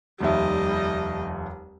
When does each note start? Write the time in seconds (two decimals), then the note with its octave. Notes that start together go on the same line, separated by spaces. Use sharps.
0.21 F1 D#2 G3 D#5 E5